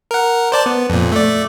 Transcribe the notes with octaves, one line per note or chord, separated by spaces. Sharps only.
A#4 F#5
C5 D5 A5
B3
F2 A#2
A3 D5